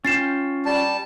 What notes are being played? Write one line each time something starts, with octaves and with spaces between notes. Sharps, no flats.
C#4 F4 G5 A6 C7 E7
G3 A5